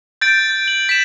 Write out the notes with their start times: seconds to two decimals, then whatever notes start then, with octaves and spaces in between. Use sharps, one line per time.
0.21 G6 A6 D7
0.68 F#7
0.89 B6 E7